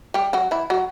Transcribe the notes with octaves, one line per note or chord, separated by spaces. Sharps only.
G3 G4
F#3 F#4
E3 E4
F#3 F#4